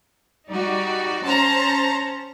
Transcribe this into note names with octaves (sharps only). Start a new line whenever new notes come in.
G3 D#4 F#4 D5
C#4 C5 A5 A#5